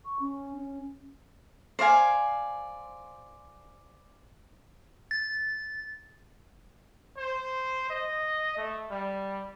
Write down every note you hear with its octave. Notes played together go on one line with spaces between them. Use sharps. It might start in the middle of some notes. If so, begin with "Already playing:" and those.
C#6
C#4
C#4
C5 D5 F5 G#5
A6
C5
D#5
A3
G3